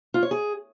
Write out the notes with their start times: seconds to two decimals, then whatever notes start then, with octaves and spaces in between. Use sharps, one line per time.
0.14 F4
0.23 C#5
0.31 G#4